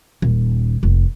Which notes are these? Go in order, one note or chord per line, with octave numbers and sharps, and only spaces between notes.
D#1
F1